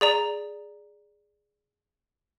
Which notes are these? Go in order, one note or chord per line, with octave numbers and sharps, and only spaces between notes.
G#4 D5 A#5